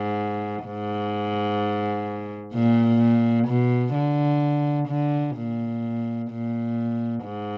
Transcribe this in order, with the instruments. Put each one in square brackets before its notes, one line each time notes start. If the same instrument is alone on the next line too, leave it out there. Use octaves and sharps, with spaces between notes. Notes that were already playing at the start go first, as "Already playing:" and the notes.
Already playing: [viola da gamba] G#2
G#2
A#2
B2
D3
D3
A#2
A#2
G#2